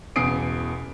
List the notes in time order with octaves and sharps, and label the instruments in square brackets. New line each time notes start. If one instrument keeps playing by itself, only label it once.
[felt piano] E1 E2 C#3 D#6 C7 D7